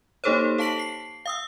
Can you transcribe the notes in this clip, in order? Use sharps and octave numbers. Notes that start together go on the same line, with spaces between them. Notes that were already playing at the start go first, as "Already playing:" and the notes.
A#3 D#4 G4 A4 C5 C#5
A4 F5 A5 B6 D7 F#7
C7
F5 D#6 E6